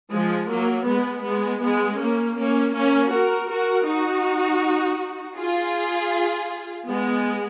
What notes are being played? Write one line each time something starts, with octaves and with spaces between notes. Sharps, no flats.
F3 G#3
F#3 A#3
G#3 B3
G#3 B3
G#3 B3
A#3 C#4
A#3 C#4
A#3 C#4
F#4 A#4
F#4 A#4
D#4 F#4
F4 G#4
G#3 B3